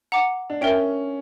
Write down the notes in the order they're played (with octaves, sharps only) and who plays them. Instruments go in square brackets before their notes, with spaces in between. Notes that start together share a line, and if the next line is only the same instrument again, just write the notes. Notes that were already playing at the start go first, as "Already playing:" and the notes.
[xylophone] F#5 A#5 D6
[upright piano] D4
[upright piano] C#4 [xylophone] A#4 E5 G5